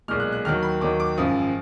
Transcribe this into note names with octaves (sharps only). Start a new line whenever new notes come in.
B1 A#2 G#3 F6
F#6
F#6
D#2 D#3 F#3 F6
B5
D#2 D#3 F#3 D6
D6
G#1 F#2 F3 D#6